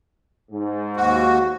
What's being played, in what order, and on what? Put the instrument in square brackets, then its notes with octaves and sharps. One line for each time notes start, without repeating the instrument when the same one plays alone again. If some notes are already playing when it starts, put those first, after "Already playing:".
[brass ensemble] G#2
[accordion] D#2 F#4